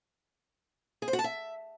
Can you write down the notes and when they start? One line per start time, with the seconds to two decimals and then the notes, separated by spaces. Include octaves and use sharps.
1.02 G#4
1.08 C5
1.13 F#4
1.19 A5
1.24 E5